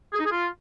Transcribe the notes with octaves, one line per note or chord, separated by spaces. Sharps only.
G#4
D#4
G#4
F4